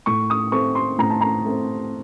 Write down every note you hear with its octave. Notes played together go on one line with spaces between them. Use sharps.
A2 C#6
D#6
A3 C4 C#6
C6
A2 A#5
A5
A#5
A3 C4